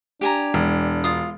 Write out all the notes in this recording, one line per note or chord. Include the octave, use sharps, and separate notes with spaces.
D4 G4 G#5 A#5
E1
F4 D#6